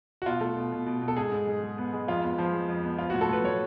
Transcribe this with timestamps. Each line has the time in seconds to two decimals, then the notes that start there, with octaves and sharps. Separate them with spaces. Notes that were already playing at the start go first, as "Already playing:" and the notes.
0.22 F#4
0.26 B2 F4
0.41 A3
0.56 B2
0.72 B2
0.86 B2
1.02 B2
1.08 A4
1.17 G#2 G#4
1.32 G#2
1.47 G#3
1.63 G#3
1.78 B3
1.93 G#3
2.08 F2 F4
2.22 B3
2.38 F3
2.53 G#3
2.68 F2
2.84 B3
2.99 F3 F4
3.10 A2 F#4
3.21 A4
3.29 A2 B4
3.44 A2 C#5